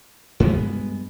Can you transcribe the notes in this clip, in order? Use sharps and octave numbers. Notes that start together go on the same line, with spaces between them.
G2 G#3 B3